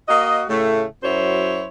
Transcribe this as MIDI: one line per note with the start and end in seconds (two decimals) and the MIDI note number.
0.08 0.42 58
0.08 0.42 66
0.08 0.42 75
0.49 0.84 45
0.49 0.84 49
0.49 0.84 57
1.03 1.68 42
1.03 1.68 54
1.03 1.68 64
1.03 1.68 72
1.03 1.68 73